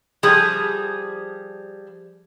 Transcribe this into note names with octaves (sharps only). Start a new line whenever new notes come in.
F3 G3 G#4